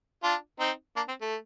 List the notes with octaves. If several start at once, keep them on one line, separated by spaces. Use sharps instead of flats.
D4 F4
C4 D#4
A#3 D4
C4
A3